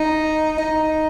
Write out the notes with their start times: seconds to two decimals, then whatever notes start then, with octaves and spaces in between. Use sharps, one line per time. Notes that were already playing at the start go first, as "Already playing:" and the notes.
Already playing: D#4
0.58 D#4